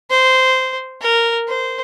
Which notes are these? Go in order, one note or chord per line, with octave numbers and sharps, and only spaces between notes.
C5
A#4
C5